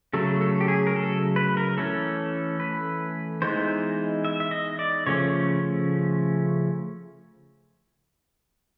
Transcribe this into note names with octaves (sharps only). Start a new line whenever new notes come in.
C#3 F#3 A3 A4
A4
G4
G#4
A#4
A4
B4
A#4
E3 A3 C#4 A4
B4
E3 G#3 B3 D#4 C5
E5
E5
D#5
D5
C#3 F3 A3 C#4 C#5